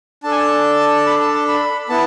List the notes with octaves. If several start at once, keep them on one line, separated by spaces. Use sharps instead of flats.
D4 A4 A5
G#5
A5
A5
B5
A5
A5
B5
B3 E4 A5